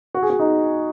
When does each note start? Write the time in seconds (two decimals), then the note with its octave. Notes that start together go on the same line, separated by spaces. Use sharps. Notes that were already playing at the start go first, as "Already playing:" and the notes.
0.14 F#4
0.22 G#4
0.30 F#4
0.39 D#4